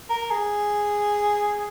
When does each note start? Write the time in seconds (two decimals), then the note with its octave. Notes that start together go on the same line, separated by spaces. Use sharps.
0.10 A#4
0.31 G#4